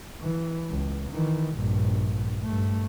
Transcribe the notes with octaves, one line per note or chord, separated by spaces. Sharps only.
E3
C#2
D#3 E3
A#1 G2
G2 A3